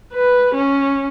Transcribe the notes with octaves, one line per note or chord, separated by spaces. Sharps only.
B4
C#4